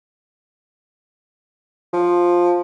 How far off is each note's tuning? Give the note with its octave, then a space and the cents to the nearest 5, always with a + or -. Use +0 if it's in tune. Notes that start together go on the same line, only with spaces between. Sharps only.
F3 +5